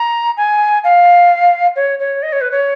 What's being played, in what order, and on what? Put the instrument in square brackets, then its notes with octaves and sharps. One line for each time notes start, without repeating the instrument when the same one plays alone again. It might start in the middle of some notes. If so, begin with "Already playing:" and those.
Already playing: [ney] A#5
G#5
F5
C#5
C#5
D#5
C#5
B4
C#5